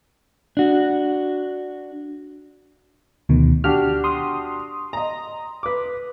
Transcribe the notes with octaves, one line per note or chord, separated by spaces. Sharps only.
D4 F#4
D2 B2 D#3
D4 F#4 G4 F6
C6 D#6
D#5 A#5
B4 D6